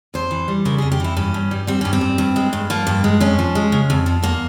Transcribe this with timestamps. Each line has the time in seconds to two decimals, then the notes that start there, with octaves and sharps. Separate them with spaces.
0.14 F2 C5
0.31 E3
0.48 G3
0.65 C#3 A#4
0.78 F2 G#4
0.92 G4
1.00 E3 E4
1.16 G2 C#4
1.34 G2
1.51 G3
1.67 G3 C4
1.81 G2 C#4
1.93 C4
2.01 G2
2.18 G2
2.36 G#3
2.53 G2
2.70 F3 A#3
2.87 G2
3.04 G#3
3.20 F2 C#4
3.39 F3
3.55 G#3
3.72 C#3
3.90 F2
4.06 F3
4.23 E2 A#3